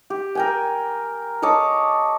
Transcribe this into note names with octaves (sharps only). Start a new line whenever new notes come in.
G4
A#4 G5 G#5
A4 C#5 D#5 D6